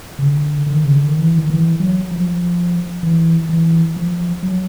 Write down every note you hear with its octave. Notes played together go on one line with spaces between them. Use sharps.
C#3
D3
D3
D#3
C#3
D3
D#3
E3
D#3
E3
F#3
F3
E3
E3
F3
F#3